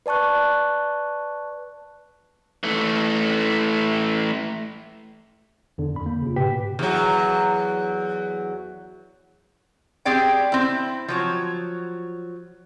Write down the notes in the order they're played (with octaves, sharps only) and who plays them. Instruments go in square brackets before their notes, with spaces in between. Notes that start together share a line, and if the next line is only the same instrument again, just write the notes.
[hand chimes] B4 D5 A5 C#6 F#6
[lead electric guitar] E3 A3
[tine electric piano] E2 D3
F2 B5
A#3
C#3 F4
G#2 B2 G4 B4 G5 B6
[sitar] E2 F#3
[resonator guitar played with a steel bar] C4 G4 G#4 D5 G5
C4 E4
F3 F#3 C#5